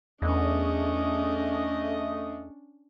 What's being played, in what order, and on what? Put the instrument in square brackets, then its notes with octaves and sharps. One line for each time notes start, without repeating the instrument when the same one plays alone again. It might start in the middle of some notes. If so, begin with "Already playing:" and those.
[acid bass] E2 [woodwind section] A3 D#5 [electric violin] C#4 D4